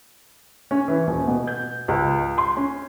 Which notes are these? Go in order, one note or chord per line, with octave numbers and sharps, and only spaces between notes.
C#4
E3
D#1
B2
G6
C#2
C6
C#4